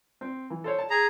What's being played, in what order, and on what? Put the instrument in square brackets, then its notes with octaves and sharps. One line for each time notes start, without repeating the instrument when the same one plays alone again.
[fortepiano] C4
E3
A4 C5 C#5
A5
[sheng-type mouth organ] G#4 A#5